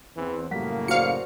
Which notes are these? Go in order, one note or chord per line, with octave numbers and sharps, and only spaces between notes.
E2 E3 C4
F#2 A2 C#3 G3 A#3 F#5 B6
F#4 C5 D5 F5 C#7